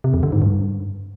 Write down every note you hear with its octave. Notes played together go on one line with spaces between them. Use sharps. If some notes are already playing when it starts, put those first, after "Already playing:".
C3
F2
D3
G#2
G2